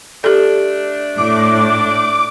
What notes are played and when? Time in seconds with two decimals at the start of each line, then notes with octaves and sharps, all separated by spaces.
0.24 A3 D4 G4 A4
1.18 A2 D6